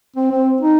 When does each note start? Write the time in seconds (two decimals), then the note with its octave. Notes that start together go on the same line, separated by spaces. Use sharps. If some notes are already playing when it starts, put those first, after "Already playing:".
0.16 C4
0.31 C4
0.61 D#4